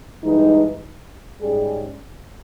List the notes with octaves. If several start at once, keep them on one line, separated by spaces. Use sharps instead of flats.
G2 E3 G#3 D#4
G#2 G3 C#4 G#4